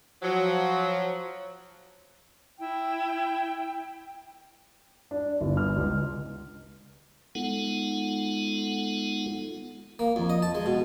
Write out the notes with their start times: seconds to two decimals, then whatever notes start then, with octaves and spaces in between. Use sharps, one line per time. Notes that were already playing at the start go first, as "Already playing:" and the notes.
0.23 F3 F#3
2.60 E4 G5
5.11 D4
5.41 G1
5.57 F6
5.76 C#2
7.35 G#3 B3 D#4 F4 A4 F#5
9.99 A#3
10.16 F2
10.30 D#5
10.42 A5
10.55 G#3
10.66 B2